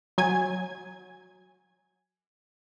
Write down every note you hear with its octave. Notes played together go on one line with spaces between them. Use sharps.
F#3 G#5 G#6